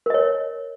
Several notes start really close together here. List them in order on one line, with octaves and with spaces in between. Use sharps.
A#4 D#5 C#5